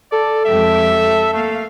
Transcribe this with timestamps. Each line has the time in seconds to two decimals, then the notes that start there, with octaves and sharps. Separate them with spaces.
0.12 A4 D5
0.45 F2 G#3 G4 E5
1.34 A3 A#3 F5